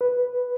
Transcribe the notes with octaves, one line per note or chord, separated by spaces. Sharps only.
B4